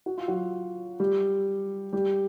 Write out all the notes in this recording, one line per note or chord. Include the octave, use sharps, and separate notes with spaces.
F#4
F4
F#3 F#4
G3 G4
G3 G4